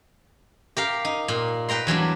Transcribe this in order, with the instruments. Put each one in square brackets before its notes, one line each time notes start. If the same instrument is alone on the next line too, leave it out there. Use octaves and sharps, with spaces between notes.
[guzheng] G4 A#4 F5
D#4
A#2
B4 G5 A#5 C6
E2 F#3 G3 D4